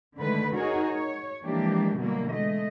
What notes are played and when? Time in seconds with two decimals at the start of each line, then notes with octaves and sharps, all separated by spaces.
0.17 D3 D#3 G#3 A3 B4
0.55 D#4 F#4 G#4 A#4 C#5
0.87 C#5
1.44 E3 F3 G#3 A#3 D4 G4
1.97 B2 D3 E3 F#3 G3 A#3
2.31 G#3 A3 D#5